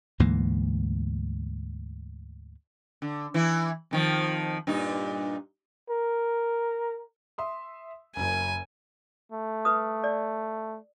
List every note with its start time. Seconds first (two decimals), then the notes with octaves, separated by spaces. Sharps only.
0.20 D2 G#2 E3 A#3
3.02 D3
3.34 E3 E4
3.91 F2 D#3 F3
4.67 G2 A#2 D#4
5.90 A#4
7.38 E5 C6 D#6
8.16 F#1 F#2 G#5
9.32 A3
9.65 B4 D#6
10.04 D5